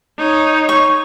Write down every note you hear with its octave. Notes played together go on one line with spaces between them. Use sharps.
D#4 C#5
C#6